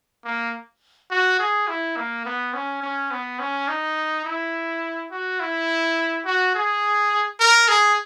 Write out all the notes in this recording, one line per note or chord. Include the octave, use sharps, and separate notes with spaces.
A#3
F#4
G#4
E4
A#3
B3
C#4
C#4
B3
C#4
D#4
E4
F#4
E4
F#4
G#4
A#4
G#4